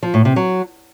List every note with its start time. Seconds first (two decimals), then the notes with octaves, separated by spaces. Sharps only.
0.03 F3
0.14 A2
0.25 C3
0.36 F#3